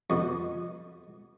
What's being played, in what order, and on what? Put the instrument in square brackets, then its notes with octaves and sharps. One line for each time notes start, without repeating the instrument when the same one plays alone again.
[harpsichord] F2 B2